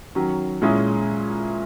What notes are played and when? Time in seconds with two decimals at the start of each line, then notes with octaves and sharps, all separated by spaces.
0.15 D#3 F#3 C#4
0.62 A#2 G#3 C#4 E4 G#4